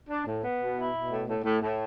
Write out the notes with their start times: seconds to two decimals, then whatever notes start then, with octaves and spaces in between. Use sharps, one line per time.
0.08 D4
0.25 A2
0.42 B3
0.59 B2
0.76 E4
0.93 B2
1.10 A2
1.27 A2
1.44 A2
1.61 A2